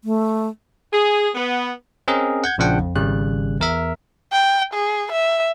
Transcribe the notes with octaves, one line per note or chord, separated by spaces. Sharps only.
A3
G#4
B3
C4 C#4 G#4 A#4 D#5
F#5 G6 G#6
A#1 C#3 F3 D4 F#5 G5
F2
G#1 C#3 G3 F#6
E2 A#4 E5
G5
G#4
E5